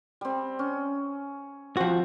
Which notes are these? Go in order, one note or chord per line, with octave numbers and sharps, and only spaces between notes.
G3 C4
C#4
F3 C4 F#4